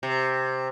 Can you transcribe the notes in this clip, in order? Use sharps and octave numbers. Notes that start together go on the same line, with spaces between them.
C3